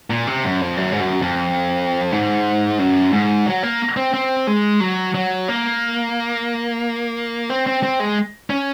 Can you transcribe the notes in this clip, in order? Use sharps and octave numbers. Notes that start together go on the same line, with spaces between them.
A#2
C3
F#2
F2
F#2
G#2
F#2
F2
G#2
F#2
G#2
F#3
A#3
C4
C4
G#3
F#3
F#3
A#3
C4
C4
C4
G#3
C#4